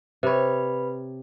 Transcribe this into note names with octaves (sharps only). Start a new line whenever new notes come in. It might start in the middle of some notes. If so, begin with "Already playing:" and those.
C3 B4 C#5 B5